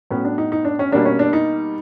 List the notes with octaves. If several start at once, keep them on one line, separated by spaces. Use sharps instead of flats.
A2 F#3 B3 C#4
D4
D#4
D#4
D4
C#4
B2 G3 A#3 C#4 D4
C#4
D4
D#4